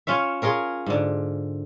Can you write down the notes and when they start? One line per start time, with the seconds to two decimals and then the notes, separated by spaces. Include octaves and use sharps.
0.07 C#4 F4 C#5 E5
0.42 F4 G#4 A#4 C#5
0.87 G#2 D3